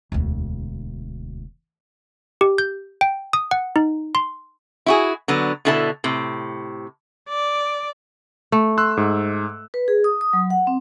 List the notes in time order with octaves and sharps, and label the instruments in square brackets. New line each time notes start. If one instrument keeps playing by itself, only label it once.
[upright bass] E1 D2
[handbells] G4
G6
G5
D#6
F#5
D#4
C6
[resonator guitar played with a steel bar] E4 F#4 G#4
D3 F#3 B3
B2 D3 E4 A4 A5
A2 C3
[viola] D5
[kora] A3
[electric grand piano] C6 E6 F#6
G#2
[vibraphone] B4
G#4
D#6
D#6
F#3
F#5
C4